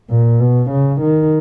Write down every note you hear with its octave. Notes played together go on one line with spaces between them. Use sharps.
A#2
B2
C#3
D#3